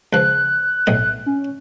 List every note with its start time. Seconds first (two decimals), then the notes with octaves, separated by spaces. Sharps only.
0.13 C#2 F3 F#6
0.87 B1 A2 D#5
1.26 C#4